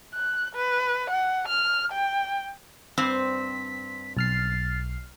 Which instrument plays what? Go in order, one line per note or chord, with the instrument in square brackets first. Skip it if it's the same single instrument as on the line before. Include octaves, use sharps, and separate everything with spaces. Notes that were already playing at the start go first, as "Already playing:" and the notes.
[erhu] F#6
B4
F#5
F6
G5
[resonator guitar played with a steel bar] G2 C4 C5 [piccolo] B6
[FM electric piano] B1 F6 C7 [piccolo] A6